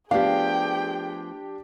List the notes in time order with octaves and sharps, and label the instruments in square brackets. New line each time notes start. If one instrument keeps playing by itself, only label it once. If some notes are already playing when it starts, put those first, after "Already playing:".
[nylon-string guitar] F3 A3 B3 [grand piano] D4 G4 [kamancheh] G#4 G5 [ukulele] F5